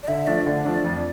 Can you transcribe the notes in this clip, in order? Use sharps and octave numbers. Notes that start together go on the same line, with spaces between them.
D5
D3 E5
F3 A3 D4 D5
D3
F3 A3 D4
F2